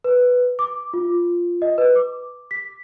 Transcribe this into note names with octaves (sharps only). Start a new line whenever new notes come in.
B4
D6
F4
D#5
B4
D6
B6